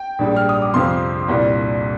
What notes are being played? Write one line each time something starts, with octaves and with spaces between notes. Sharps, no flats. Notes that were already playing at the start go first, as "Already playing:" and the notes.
Already playing: G5
A#1 G#2 G3
F6
D#6
D6
F2 C3 F3 C6
C2 A#2 G3